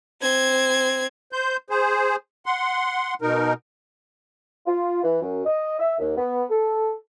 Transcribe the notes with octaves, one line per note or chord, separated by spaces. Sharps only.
C4 G#6
C5 G6
G#4 C5
F#5 C6
B2 D#4 A#4
F4
E3
F#2
D#5
E5
D#2
B3
A4